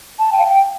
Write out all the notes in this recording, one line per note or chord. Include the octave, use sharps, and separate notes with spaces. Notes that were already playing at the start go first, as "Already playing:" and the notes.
A5
G5
F5
G5